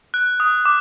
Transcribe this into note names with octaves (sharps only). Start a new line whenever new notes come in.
F#6
D#6
D6